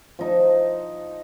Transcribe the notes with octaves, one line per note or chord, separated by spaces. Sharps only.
F3 D#4